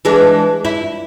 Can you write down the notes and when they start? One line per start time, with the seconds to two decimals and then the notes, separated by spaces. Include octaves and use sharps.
0.05 E3 G#3 D4
0.65 E4